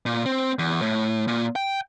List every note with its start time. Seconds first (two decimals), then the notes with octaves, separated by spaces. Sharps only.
0.06 A#2
0.26 C4
0.59 E2
0.82 A2
1.28 A#2
1.56 G5